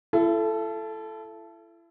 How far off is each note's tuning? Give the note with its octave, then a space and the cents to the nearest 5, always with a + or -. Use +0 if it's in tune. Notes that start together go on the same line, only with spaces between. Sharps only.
E4 +35 A4 -10